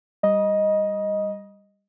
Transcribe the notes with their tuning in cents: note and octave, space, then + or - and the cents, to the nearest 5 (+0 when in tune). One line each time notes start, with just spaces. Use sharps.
G3 +10 D#5 +0 B5 -45